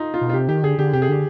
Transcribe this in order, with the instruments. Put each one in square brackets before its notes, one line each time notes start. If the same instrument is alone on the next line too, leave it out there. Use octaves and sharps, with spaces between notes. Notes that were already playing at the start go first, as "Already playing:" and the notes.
Already playing: [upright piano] D#4 F4
F4
[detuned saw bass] B2
[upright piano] F4
[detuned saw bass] C3 [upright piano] G4
[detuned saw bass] D#3 [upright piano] G4
[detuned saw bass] D3 [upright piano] G#4
[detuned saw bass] D3 [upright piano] G4
[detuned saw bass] C3 [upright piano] G4
[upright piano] G#4
[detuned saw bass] D3 [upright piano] G4